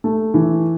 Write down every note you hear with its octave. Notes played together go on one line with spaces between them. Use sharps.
A3
E3